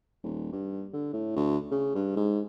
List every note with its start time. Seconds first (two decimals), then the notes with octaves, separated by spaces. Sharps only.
0.24 D#1
0.52 G2
0.93 D3
1.13 A2
1.36 D2
1.71 C#3
1.95 G2
2.16 G#2